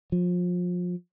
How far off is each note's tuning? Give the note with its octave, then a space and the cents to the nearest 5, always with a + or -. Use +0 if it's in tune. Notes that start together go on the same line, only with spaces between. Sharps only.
F3 +30